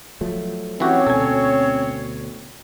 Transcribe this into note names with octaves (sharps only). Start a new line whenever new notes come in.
F3 F#3 A3
E3 C4 C#4 F#4 G4 C#5
D2 B2 A4 G#5